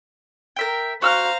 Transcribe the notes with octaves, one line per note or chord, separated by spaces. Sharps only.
A#4 E5 G5
F#4 C5 F5 A#5 E6 F6